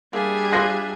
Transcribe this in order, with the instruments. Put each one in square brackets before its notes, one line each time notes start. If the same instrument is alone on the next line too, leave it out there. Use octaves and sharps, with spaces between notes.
[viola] G3 G#4 [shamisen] A#3 [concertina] D4 G4 E5
[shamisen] F4 A4 C5 [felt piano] F#6 A#6 C7